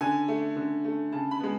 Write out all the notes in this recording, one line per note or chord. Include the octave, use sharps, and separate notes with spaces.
D3 G#5
A3
D3
A3
C#3 A5
B5
G#3 B3